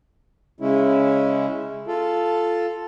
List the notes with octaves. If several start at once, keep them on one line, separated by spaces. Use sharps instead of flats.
C#3 G#3 C#4 E4
F4 A4